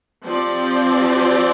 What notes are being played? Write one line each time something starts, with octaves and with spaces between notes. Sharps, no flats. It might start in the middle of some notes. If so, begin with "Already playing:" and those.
F3 C4 G4 D5